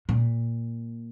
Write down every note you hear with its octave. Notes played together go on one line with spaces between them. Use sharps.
A#2